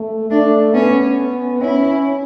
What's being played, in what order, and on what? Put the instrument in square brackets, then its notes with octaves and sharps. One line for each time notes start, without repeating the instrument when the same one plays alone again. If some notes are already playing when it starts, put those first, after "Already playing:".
Already playing: [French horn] A3
[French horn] A3 [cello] D4
[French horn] B3 [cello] C#4
[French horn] C#4 [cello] E4